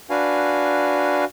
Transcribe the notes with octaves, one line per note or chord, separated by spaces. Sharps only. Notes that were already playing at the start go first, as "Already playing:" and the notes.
D4 F#4 B4 F5 G#5